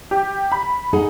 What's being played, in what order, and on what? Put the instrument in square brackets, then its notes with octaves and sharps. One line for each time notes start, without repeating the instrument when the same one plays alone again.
[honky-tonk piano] G4
B5
[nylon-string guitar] D#4 G#4 F#5